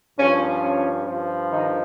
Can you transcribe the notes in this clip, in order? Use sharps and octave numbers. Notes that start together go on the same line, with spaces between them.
G2 F3 C#4
C#4
G2 F3
D#3 D#4